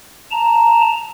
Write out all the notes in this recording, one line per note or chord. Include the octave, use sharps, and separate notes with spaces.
A5 A#5